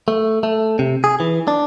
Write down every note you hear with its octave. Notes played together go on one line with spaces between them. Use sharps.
A3
A3
C3
G#4
E3
D4